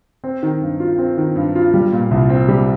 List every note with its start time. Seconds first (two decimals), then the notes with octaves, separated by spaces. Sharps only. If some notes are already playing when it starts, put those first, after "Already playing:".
0.24 C4
0.43 D#3
0.61 G2
0.80 F4
0.98 C4
1.17 D#3
1.36 G2
1.55 F4
1.74 G3
1.92 A#2
2.11 C2
2.29 C4
2.48 G3